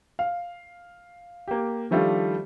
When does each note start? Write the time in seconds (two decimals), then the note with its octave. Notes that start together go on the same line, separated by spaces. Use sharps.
0.19 F5
1.48 A#3 G4
1.91 D#3 F3 G3 A3 D4 F4